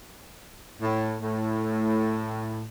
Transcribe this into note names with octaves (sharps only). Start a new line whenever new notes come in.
A2
A2